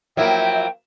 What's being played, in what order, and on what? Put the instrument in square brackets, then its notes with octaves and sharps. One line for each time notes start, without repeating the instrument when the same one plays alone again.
[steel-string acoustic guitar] F3 A#3 [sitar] F#3 E4 [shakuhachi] E5 [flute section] G5